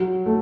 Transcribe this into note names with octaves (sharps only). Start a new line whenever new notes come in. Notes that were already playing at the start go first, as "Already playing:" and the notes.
Already playing: F#3
A3